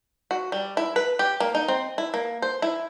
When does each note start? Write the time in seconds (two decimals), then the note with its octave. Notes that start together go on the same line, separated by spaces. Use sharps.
0.31 F#4
0.52 G3
0.77 E4
0.96 B4
1.19 G4
1.40 A#3
1.55 D#4
1.68 C4
1.98 E4
2.14 A#3
2.42 C5
2.62 E4